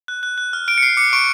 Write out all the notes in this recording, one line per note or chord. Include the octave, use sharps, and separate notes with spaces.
F#6
F#6
F#6
F6
F6 D7
C#7
F6 C7
D6 C#7
C#6 D7